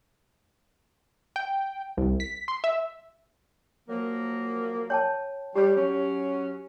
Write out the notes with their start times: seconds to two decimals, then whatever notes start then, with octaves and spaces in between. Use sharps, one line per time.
1.36 G5
1.97 C2
2.20 B6
2.48 C6
2.64 E5
3.89 F3 F#3 A#3
4.90 C#5 G5 A5
5.55 G3 G4 C#5
5.77 F#3 C#4